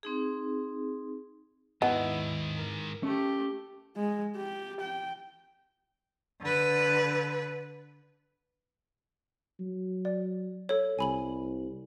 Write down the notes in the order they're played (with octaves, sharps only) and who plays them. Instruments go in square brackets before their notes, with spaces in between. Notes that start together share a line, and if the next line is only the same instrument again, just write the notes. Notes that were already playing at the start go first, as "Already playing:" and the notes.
[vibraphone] C4 D#4 G#4
[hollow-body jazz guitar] D#2 D#5 [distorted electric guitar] G#2 D#3 [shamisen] B3 [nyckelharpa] E4
[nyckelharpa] A#4
[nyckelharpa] A3 G4 [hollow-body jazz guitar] C#4
[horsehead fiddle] G#3
G4
G5
[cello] D3 B4
[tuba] F#3
[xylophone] D5
A4 C#5
[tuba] C2 [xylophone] G#5 B5 F#7